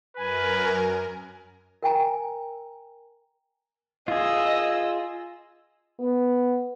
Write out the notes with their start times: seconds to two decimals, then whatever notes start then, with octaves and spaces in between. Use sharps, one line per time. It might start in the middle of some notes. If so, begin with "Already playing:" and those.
0.17 F#2 A#4 B4 G#5
1.83 A#4 G5 G#5 A#5
4.08 F4 G#4 D#5 E6
5.99 B3